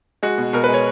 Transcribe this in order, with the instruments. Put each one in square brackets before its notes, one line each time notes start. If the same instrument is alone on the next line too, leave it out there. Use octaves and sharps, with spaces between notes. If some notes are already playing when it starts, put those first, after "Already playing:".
[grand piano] G#3 F#4
B2
B2 A#4
G#3 B4
C#5